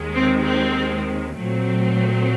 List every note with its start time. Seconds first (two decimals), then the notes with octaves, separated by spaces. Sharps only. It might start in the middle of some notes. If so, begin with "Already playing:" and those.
Already playing: D#2 D#3 G#3
0.15 C4
0.44 C4
1.34 A#2 F#3 A3 C4